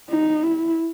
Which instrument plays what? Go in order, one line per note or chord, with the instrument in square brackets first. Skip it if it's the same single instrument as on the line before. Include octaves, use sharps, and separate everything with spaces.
[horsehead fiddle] D#4
E4